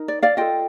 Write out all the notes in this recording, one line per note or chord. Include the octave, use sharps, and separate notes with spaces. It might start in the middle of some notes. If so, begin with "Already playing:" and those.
Already playing: D#4 A#4
D5
D5 F5
F4 A4 D#5 G5